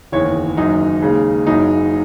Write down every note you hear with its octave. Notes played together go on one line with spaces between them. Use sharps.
F#1 E2 D#3 C#5
F#1 F#2 D#3 F#3 D#4
D#2 C#3 G#3
F#1 F#2 C#3 F#3 D#4